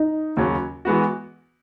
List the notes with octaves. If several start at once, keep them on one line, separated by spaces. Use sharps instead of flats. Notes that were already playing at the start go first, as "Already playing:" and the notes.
Already playing: D#4
D#2 C#3 F#3 C#4
E3 G#3 B3 F#4